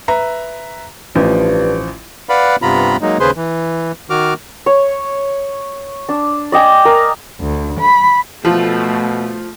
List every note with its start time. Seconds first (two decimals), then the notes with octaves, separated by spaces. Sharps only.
0.08 B4 E5 A#5
1.15 A1 G2 F3
2.29 B4 D5 F5 F#5 B5
2.62 G2 C3 B3 F4 A#5 B5
3.01 F#3 G#3 A#3 D#4
3.20 D#2 C#3 G#4 B4 C5 C6
3.36 E3
4.10 D#3 F#4 D6 F6
4.66 C#5
6.09 D4
6.52 D5 D#5 G5 G#5
6.85 A#4
7.38 D2
7.80 B5
8.45 B2 F3 A3